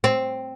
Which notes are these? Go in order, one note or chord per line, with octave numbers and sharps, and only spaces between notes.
C4